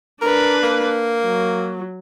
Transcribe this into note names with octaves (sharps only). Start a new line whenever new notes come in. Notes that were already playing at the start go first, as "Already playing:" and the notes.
D4 A#4 B4
A#3
F#3